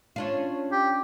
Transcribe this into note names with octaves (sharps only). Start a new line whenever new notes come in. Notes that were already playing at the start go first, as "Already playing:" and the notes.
C#4 D4 F4
G4